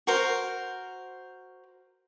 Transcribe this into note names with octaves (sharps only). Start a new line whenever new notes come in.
F#4 A#4 C5